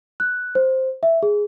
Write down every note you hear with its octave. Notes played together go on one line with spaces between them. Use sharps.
F#6
C5
E5
G#4